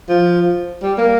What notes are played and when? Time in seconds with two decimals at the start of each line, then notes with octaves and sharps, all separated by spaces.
0.09 F3
0.83 G3
0.98 A#3